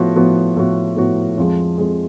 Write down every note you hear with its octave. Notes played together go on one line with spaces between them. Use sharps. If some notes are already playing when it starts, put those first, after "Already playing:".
Already playing: A2 F3 B3 F#4
A2 F3 B3 F#4
A2 F3 B3 F#4
A2 F3 B3 F#4
F2 F3 G#3
F2 F3 G#3